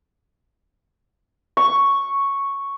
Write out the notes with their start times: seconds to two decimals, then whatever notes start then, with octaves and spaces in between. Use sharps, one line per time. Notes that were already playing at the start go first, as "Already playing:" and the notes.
1.57 C#6